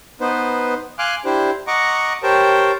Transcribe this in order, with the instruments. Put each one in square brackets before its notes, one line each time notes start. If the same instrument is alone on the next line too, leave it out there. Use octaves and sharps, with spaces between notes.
[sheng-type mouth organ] B3 D#4 B4 C5
F5 G#5 C6 D6 F6 F#6
D4 E4 G4 C5
D#5 F#5 A#5 C#6 D6
G4 A#4 C5 C#5 G5 A5